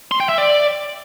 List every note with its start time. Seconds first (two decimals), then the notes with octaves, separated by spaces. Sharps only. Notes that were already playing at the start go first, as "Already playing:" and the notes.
0.11 C6
0.20 G5
0.29 E5
0.38 D5